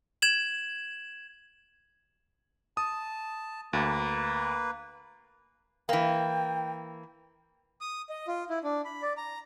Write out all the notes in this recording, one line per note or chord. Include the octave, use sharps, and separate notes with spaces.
G#6 E7 F#7
A5 D#6
D2 A#3 B4
E3 A#3 G5
D#6
D#5
F4
E4
D4
B5
D5
A#5